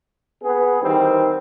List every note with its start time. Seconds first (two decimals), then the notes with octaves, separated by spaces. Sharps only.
0.43 B3 G#4
0.82 D#3 E3 G3 C4